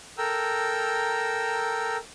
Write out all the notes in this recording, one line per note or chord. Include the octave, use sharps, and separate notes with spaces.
A4 A#4 G5 A#5 E6